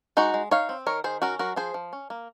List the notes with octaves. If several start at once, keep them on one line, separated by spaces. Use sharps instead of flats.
G#3 D#4 F#4
G#3
D#4 C#5 F5
C4
D#3 A#4 C#5
D#3 G#4 C5
C#4 F#4 A#4
F#3 F#4 A#4
F3 G#4 C5
F3
C#4
A#3